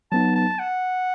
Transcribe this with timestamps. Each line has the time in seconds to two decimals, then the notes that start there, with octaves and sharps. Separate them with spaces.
0.11 F#3 B3 D#4 A5
0.36 A5
0.59 F#5